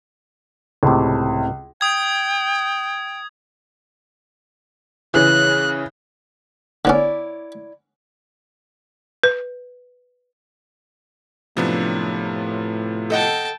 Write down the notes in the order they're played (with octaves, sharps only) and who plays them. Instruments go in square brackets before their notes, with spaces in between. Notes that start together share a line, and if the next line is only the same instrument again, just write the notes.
[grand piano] C#2 [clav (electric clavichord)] A2 C3
[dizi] G5 [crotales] D#6 G#6
[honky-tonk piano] C#3 E3 [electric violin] F#6
[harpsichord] D3 B3 C#4 [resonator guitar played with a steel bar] E4 C#5 D5
[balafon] B4
[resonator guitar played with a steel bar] F#2 F#3 D4 [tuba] A2 [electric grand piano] C3 F3 B3
[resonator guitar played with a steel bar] A4 D#5 F#5 [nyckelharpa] G5 A5